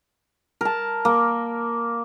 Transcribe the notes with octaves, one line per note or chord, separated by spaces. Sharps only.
A#4 A5
A#3